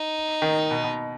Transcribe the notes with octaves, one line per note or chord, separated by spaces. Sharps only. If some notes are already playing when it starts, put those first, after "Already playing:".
Already playing: D#4
D#3
B2
B2